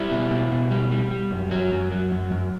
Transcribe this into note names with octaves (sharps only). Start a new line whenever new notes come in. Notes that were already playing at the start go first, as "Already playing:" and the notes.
Already playing: G3 E4
B2
B2
B2
G3
G3
G3
F#2
F#3
F#2
F#3
F#2
F#2